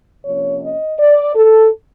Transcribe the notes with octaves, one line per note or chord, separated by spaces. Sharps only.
C3 F3 A#3 C#4 C#5
D#5
D5
A4